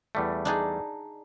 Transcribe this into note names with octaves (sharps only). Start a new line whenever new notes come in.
E2 G3 A3
D4 D#4 G#4